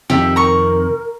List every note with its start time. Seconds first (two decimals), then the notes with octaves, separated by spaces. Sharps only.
0.10 F2 C3 D#3 G4 E5
0.36 A#4 A#5 C#6